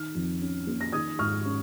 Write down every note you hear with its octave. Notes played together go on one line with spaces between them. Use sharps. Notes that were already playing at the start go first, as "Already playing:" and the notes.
Already playing: D#3 F6
F2
C#4
A#3
A#6
D#3 D#6 G#6
G#2 C#6 F6
C#4